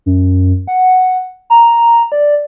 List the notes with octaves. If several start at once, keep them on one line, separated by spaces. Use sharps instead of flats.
F#2
F#5
A#5
D5